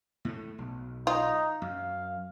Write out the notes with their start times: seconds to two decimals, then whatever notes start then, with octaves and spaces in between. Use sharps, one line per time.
0.25 A2 A3
0.58 B1
1.07 D#4 F4
1.62 F#2 F5